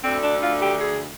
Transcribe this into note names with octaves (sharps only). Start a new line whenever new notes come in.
D2 D3 C4
D4
F4
G4
G#4